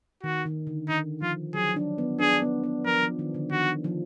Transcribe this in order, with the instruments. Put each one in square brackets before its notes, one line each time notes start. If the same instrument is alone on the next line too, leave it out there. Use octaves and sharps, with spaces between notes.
[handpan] D#3 [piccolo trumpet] F#4
[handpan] D#3
D3
[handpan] D#3 [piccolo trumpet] D#4
[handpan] F3 [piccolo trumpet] F4
[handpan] F#3 [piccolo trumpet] G#4
[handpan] D4
B3
[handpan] D4 [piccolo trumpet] G#4
[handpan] B3
B3
[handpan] F3 [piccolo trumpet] A#4
[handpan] F3
D#3
D3
[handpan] D#3 [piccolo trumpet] F#4
[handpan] F3